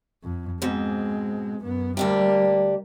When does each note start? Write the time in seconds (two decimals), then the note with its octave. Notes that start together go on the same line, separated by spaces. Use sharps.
0.23 F2
0.62 G#2 B2 G#3 C4
1.61 F#2 B3
1.97 D2 G3 A#3 D4 G4